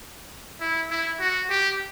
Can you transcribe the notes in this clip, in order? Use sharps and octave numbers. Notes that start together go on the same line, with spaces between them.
E4
E4
F#4
G4